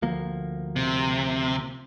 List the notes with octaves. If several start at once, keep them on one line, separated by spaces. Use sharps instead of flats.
D2 F3 A#3
C3